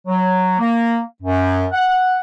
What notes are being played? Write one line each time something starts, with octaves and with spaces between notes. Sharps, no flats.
F#3
A#3
F#2
F#5